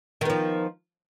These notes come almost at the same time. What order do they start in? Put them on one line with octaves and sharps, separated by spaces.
D#3 B3 F3